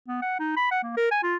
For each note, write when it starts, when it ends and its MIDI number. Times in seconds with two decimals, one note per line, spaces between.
0.08 0.21 59
0.22 0.38 78
0.39 0.54 63
0.56 0.69 83
0.71 0.80 78
0.83 0.94 58
0.97 1.09 70
1.11 1.20 80
1.23 1.36 65